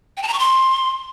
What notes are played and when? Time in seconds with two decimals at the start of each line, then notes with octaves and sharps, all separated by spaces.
0.17 G5
0.23 A5
0.28 A#5
0.34 C#6
0.39 C6